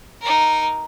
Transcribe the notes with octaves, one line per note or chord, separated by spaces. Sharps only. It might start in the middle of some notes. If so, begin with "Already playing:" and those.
D#4 A#4